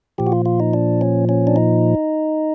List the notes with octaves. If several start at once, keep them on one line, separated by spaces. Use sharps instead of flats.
A#2 F3 G4
F#4
F4
F4
D#4
D4
C#4
C#4
D4
D#4